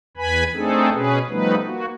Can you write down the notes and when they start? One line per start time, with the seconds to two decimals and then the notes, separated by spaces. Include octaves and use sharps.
0.17 E2 B4 G#5 B5
0.54 A3 C4 D4 D#4 G#4 A4
0.92 B2 C#4 G#4 B4
1.29 F3 G3 A3 B3 D#4 B4
1.65 A#3 F#4